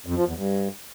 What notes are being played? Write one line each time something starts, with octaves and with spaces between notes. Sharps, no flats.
F2
F3
E2
G2